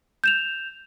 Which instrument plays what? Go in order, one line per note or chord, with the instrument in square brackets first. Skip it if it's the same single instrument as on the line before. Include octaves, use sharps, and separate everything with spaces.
[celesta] G6 E7 F7